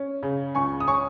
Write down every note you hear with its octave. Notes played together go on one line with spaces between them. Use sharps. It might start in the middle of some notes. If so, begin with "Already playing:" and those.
Already playing: C#4
C#3
C#2 G#5 C#6
D#6
C#4 G#5 C#6